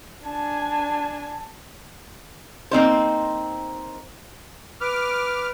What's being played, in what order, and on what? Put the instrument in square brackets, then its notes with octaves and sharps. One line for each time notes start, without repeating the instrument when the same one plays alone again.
[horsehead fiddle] D4 G#5 [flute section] A5
[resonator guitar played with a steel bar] A#3 C4 D#4 C5
[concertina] B4 [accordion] D6 F6